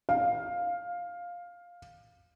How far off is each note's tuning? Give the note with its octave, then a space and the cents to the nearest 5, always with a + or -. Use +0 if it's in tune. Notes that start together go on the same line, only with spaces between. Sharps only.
F5 +10